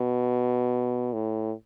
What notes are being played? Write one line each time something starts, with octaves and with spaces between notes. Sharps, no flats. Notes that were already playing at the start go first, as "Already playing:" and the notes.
Already playing: B2
A2